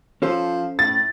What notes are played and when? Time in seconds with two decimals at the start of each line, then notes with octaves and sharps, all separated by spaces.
0.22 F3 C#4 A4 C5
0.79 A2 A6